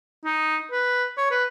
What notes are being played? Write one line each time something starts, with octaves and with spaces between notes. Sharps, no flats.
D#4
B4
C#5
B4